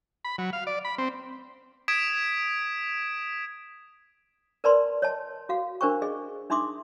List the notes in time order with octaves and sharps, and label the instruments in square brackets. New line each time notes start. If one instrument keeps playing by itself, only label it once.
[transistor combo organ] B5
F#3
F5
D5
B5
C4
[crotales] D#6 G#6 B6 D7 E7
[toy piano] A#4 B4 D5 A5 B5 C6
C#5 D#5 A5
F#4 F5
D4 A#4 C5 G5 C#6
G#4 D#5
D4 D#4 E5 C6 D6 D#6